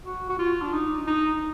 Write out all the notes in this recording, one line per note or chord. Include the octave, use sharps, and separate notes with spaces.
F#4
F#4
F4
D4
D#4
D#4